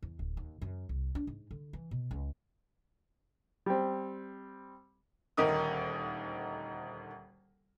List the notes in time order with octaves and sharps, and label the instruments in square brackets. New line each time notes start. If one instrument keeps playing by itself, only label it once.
[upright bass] E2
D1
D#2
F#2
C2
D4
G#2
D3
E3
B2
C#2
[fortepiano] G3 C4
[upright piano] D#1 D2 D#3 D#4 A#4 D#6